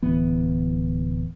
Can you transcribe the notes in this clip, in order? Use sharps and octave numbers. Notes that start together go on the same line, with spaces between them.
D1 E3 B3